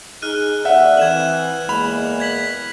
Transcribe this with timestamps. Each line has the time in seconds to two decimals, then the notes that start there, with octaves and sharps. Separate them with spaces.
0.22 D#4 G#4 F6 F#6 D#7
0.65 D#2 A4 D5 E5 F#5 F#6
0.97 E3 C4 G#6 E7 F#7
1.69 E2 G#3 A#3 B5 F7
2.20 G#6 B6 F#7